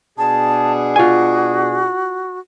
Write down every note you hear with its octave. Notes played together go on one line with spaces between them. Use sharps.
B2 D4 G#4 A5
F4 F#4 G#5